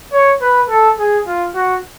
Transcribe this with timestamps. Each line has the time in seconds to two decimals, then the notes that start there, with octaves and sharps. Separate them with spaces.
0.12 C#5
0.41 B4
0.69 A4
0.99 G#4
1.27 F4
1.55 F#4